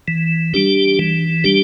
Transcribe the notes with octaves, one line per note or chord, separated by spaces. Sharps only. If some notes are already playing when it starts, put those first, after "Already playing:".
E3
G3 D4 G4
E3
G3 D4 G4